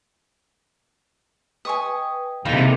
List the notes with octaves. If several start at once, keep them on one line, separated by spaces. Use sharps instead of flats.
B4 D#5 G5 G#5 C#6 D#6
D#2 C3 E3 D#4 F4 G#4 A4 E5